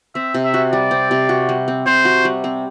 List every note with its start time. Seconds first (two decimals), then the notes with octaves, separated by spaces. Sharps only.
0.15 C4 E5
0.34 C3
0.44 E5
0.54 F#4
0.72 G3 D5
0.91 C4
1.11 C3
1.29 F#4
1.49 G3
1.68 C4
1.86 C3 C5
2.05 F#4
2.25 G3
2.44 C4